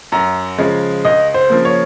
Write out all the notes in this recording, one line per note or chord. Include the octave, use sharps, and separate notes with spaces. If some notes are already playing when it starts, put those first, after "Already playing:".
F#2 A#5
C#3 F3 G#3
C#2 D#5
C5
C#3 F3 A#3
C#5